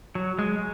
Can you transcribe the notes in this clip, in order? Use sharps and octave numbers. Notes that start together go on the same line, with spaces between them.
F#3
G#3